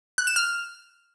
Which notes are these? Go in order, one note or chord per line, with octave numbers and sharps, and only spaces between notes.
F#6
E7
F6